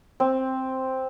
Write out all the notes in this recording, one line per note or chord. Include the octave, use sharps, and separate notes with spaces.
C4